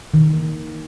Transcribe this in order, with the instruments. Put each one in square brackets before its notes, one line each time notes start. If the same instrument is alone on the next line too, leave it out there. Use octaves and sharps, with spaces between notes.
[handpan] D#3